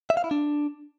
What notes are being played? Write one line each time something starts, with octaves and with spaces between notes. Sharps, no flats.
E5
F5
E4
D4